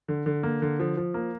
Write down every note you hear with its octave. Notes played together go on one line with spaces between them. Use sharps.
D3
D3
A#3
D3
F3
F3
A#3